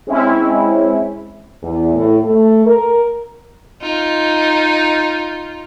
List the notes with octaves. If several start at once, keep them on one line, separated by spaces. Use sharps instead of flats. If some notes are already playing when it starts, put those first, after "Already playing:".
G#3 C4 C#4 E4
E2
A2
A3
A#4
D#4 F4